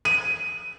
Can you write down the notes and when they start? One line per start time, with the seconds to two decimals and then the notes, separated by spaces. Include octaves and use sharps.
0.05 D#7